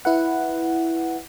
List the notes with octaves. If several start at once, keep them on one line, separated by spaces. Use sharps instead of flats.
E4 B4 F#5